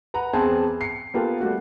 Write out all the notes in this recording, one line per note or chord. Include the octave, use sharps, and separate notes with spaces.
B4 F#5 A#5
E2 C4 G#4 B4 A5
C7 C#7
A#3 B3 F4 G4 A4
G3 A3 F#4